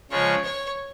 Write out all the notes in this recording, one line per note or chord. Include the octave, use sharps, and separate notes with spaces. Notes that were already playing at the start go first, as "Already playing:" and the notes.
C#3 F3 G#3 C#5
C#5